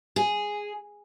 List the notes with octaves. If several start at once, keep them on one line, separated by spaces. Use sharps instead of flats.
G#4